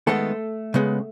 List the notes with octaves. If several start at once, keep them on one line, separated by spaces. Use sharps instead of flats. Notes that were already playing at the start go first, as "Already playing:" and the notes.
D#3 G#3 A3 B3 A4
C#3 G#3 B3